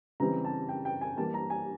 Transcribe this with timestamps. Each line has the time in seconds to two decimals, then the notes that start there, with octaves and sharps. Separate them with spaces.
0.20 C#3 E3 G3 C4 A#5
0.45 A5
0.69 G5
0.85 G5
1.01 G#5
1.17 E3 G3 A#3 A5
1.34 A#5
1.50 G#5